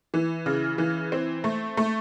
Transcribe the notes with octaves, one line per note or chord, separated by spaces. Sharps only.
E3
C#3
E3
C4
A3
A3